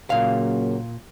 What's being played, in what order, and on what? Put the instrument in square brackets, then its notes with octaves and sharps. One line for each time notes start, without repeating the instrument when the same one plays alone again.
[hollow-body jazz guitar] A#2 F5 [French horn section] C#3 F#3 A#3